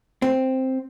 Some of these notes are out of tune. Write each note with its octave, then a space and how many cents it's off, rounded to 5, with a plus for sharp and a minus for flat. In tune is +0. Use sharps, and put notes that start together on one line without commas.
C4 +0